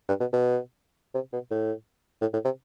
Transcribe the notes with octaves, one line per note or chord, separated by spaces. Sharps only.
G2
B2
B2
C3
B2
A2
A2
A2
C3